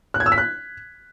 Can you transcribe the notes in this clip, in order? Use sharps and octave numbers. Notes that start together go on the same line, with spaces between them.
F#6
G#6
E6
B6
F#6